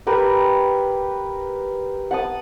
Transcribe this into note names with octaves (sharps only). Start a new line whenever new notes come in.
G4 A#4 B4
F#5 A5 D#6